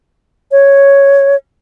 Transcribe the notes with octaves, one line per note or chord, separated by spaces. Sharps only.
C#5